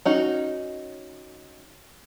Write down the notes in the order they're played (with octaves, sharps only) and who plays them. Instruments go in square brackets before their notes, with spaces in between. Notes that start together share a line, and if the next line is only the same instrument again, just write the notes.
[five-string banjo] C#4 D#4 F#4